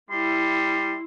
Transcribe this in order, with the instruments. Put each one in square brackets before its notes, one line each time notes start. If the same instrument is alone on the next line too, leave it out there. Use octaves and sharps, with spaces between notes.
[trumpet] G3 [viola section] E4 [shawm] C6